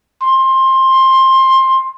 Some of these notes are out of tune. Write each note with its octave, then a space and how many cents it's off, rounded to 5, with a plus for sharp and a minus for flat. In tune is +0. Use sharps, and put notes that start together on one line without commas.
C6 +20